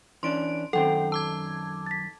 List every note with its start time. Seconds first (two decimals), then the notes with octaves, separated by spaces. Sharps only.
0.23 E3 C#4 D4 C6 D7
0.73 F#2 D#3 C4 A4 F#5 G5
1.12 A5 D6 E6 G#6
1.86 A6 B6